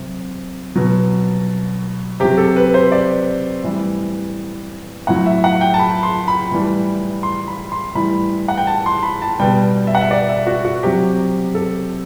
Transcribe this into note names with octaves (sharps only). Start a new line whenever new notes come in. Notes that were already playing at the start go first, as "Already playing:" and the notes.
Already playing: C3 F#3
B2 F#3
C3 F#3 G4
A4
B4
C5
D5
A2 E3 G3
A2 F#3 F#5
E5
F#5
G5
A5
B5
C6
B5
A2 E3 G3
C6
B5
C6
A2 E3 G3 B5
F#5
G5
A5
C6
B5
A5
B2 G3 G5
E5
F#5
E5
D5
E5
F#4
F#4
C3 F#3 G4
A4